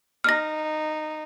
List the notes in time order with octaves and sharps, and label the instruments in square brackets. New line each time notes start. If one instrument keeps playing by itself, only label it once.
[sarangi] D#4 [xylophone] F6 A#6